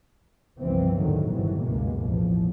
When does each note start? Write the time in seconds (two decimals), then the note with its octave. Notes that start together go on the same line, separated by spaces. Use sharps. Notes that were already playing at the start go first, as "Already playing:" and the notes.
0.60 G1 C#2 G2 E3 F3 C4
0.98 B1 E2 A2 D3 D#3 F#3
1.28 G1 G#2 C3 D#3 E3 F#3
1.60 C#2 F#2 B2 G#3 A#3
2.03 A1 E2 F3